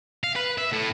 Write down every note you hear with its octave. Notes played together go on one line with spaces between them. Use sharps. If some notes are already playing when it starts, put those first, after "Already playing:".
F5
B4
E5
A2